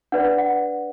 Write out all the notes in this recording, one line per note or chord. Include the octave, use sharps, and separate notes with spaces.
D4 B4 D5 F#5
F#5